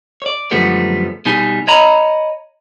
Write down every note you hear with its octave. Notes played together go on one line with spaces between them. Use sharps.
C#5 D5
F#2 D3 F3 G3 A3 B3
B2 G3 D#4 G#5
C#5 D#5 A#5 B5